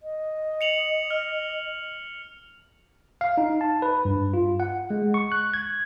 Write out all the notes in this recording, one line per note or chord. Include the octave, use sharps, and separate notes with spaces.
D#5
C#7 F7 F#7
F6
F5
D#4
A5
B4
G2
F4
F#5
G#3
C#6
F#6
G#6